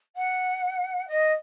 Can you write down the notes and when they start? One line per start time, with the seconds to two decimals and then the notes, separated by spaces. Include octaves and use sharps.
0.16 F#5
1.07 D#5